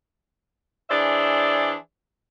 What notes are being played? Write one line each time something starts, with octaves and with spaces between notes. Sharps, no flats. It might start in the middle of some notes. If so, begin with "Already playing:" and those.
E3 D4 G#4 C5 D5 E5